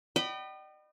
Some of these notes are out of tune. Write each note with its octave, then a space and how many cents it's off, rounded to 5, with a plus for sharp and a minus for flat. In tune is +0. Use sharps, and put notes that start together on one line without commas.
D#5 -40 G5 -35 B5 +0